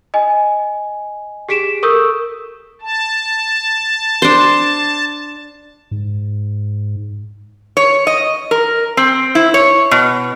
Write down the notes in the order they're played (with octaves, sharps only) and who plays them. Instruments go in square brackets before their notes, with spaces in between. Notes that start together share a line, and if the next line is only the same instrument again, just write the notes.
[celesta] D#5 G#5
G4 G#4 B6 D7 E7
A4 A#4 C#6 D#6 E6 G6
[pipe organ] A5
[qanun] D4 C5
[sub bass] G#2
[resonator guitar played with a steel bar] C#5
D#5
A#4
C4
E4
C#5
B2